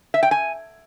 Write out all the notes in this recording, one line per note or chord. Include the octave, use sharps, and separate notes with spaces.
E5
G5
G#5